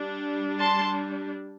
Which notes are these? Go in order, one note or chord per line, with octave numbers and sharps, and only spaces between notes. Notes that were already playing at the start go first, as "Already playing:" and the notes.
Already playing: G3 D4
A5 C6